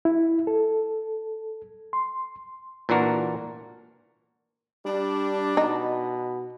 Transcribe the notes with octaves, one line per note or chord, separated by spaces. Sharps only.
E4
A4
C6
A#2 E3 D4 F#4 A#4
G3 D4
B2 D#4